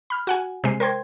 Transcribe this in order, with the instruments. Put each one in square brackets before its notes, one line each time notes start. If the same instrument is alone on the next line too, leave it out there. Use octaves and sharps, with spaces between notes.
[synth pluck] B5 F6
F#4 F#5 G#5
C3 G#3 C7
A#4 C5 G5 C6 G#6